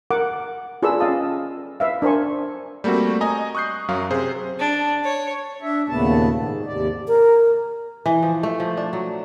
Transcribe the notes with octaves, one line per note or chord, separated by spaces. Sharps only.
A#4 F#5 D6
F4 G#4 A4 B4 D5 E6
C#4 D#5 F5 G5 A5 D#6
B4 E5 F5
D4 A#4 C5 G#5 C#6
G3 A3 A#3 C4 F#4
D#5 G#5 A#5
C#6 D#6 F#6 G6 C7
F#2 F#3 F5
C3 G#4 C5
D4
C#5
D4 E5
D#2 A#2 C#3 A3 B3 A5
G#2
D#2 C3 D5
A#4
E3
F3
A3
F3
D4
F#3